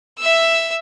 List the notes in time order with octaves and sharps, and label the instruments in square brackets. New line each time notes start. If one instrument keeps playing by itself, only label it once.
[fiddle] E5 E6